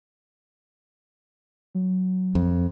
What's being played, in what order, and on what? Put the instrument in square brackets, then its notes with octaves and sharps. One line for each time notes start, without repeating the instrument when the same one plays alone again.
[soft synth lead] F#3
[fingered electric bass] F2